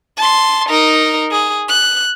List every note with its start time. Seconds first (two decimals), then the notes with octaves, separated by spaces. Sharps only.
0.17 A5 C6
0.69 D#4 A#4
1.32 G#4
1.68 F#6